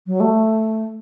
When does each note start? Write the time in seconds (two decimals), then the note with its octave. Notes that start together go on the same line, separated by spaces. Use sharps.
0.06 F#3
0.20 A3